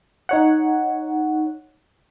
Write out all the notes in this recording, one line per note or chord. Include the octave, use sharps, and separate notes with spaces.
D#4 C#5 F#5